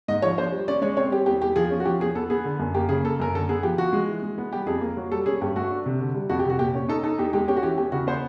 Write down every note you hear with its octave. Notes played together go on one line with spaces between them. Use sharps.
G#2 D#5
F3 C#5
D4 C5
G3
C#4 D5
G#3 C#5
C4 C#5
G3 G4
E2 G4
E2 G4
F3 G#4
C#4
F#4
F3 G4
E2 G#4
B3 A4
B3 G#4
D3
F#2
A#3 G4
C#3 G#4
A#3 A4
F#2 A#4
D3 A4
B3 G#4
F3 G4
F3 F#4
G#3
E3
G#3
B3
G3 G4
F2 G#4
A#3
F#3
G3 A4
C#4 G#4
G2 G4
A3 F#4
D4
C3
D3
G3
F2 F#4
G4
C3 F#4
A#2 G4
C#4
D#4 A4
D#4 A4
E2 G4
G#3 G4
C#4 G4
F#4
E3 G4
E2 G4
C#3 F#4
B3 C5